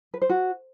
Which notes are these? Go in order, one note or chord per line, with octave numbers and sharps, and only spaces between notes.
B4
C5
F#4